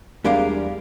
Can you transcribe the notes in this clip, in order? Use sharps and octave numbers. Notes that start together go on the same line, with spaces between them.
E2 G3 G#3 D4 A#4 F5